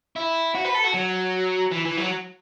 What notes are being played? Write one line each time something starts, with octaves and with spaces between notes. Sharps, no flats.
E4
F#4
B4
A4
F#4
F#3
E3
E3
F#3